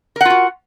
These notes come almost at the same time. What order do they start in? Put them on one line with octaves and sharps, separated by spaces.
A#4 F#5 F4 F#4